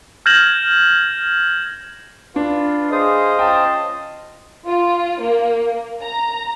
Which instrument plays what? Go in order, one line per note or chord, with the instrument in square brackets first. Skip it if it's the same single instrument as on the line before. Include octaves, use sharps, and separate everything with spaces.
[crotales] F6 G6 G#6 A#6 E7 F#7
[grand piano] D4 [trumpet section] F4 B4
[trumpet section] G#4 [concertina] C5 F5 D#6 [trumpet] D#5
[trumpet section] C#4 F4 A5 [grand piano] G5
[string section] F4
A#3
A#5